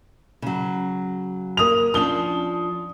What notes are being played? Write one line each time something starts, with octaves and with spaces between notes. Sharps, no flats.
C#3 F#3
A#3 D#6 F7
F3 C#4 D4 D#6 G7